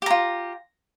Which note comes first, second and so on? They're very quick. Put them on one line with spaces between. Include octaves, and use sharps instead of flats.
G4 A#5 F4